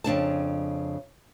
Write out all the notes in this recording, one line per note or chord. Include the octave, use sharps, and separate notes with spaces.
F2 C#3 D4 A5